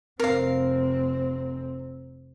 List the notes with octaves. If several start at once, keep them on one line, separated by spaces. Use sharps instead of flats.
F1 C4 A#4 F5